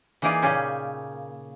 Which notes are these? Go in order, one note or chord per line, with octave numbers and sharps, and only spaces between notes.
E3 A#3 D#4 G#4 D5 F5
A#2 C#3 C#4 G4 G#4